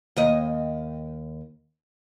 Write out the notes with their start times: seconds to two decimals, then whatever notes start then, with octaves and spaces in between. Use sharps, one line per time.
0.17 D#2 D#5